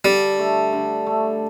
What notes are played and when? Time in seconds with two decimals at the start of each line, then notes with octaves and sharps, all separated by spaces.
0.05 D3 G3
0.39 A3
0.73 D3
1.07 A3